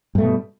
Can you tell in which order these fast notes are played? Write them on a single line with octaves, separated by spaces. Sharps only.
G2 A3 B2 G3